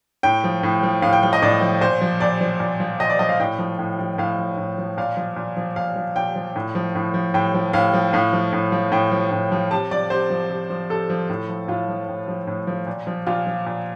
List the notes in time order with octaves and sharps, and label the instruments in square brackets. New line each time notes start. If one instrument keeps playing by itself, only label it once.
[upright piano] A2 G5
F3
A2
F3
A2 F5
G5
F3 G5
D#5
A2 D5
F3
A#2 C5
F3
A#2 D5
F3
A#2
F3
A#2 D#5
D5
F3 D#5
F5
A2 G5
F3
A2
F3
A2 F5
F3
A2
F3
A#2 F5
F3
A#2
F3
A#2 F5
F3
A#2 G5
F3
A2
F3
A2
F3
A2 G5
F3
A2 F5
F3
A2 F5
F3
A2
F3
A2 G5
F3
A2
F3
C3 A5
F3 D5
C3 C5
F3
C3
F3
C3 A4
F3
A2
F3
A2 F4
F3
A2
F3
A2
F3
A#2
F3
A#2 F4
F3
A#2